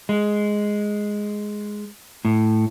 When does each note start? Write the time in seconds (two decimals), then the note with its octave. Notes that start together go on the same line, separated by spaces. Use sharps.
0.09 G#3
2.25 A2